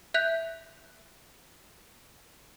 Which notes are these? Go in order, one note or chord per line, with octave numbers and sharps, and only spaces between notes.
E5 F#6 G6 B6 F7